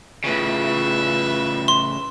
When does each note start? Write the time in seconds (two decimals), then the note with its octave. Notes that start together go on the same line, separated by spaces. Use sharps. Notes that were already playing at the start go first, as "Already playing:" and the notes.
0.24 A2 C#3 F4 B4 E5
1.68 C6